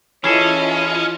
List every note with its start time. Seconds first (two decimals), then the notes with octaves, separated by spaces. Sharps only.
0.24 E3 C#4 E4 F4 G#4 A4 C#5 D#5